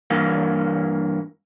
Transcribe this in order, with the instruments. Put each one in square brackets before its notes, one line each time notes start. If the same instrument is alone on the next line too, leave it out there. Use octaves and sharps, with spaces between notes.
[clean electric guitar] G2 E3 A#3